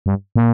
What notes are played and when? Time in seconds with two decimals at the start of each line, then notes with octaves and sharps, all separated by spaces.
0.06 G2
0.36 A#2